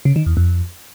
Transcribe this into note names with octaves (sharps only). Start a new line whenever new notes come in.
C#3
D#3
E2
F2